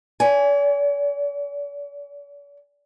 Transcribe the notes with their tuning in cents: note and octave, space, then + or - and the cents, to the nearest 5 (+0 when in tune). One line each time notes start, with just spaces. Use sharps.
D5 -45 G#5 +0